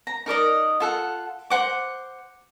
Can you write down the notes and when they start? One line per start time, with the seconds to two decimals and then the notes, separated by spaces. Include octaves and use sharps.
0.07 A#5
0.26 D#4 A#4 D5 D#5
0.80 F4 A4 F#5
1.50 C5 F#5 D6